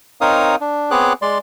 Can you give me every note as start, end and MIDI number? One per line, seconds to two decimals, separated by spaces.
0.21 0.56 60
0.21 0.56 63
0.21 0.56 70
0.21 0.56 73
0.21 0.56 77
0.21 0.56 87
0.61 0.90 62
0.91 1.13 59
0.91 1.13 60
0.91 1.13 68
0.91 1.13 73
0.91 1.13 86
0.91 1.13 90
1.22 1.38 56
1.22 1.38 74
1.22 1.38 84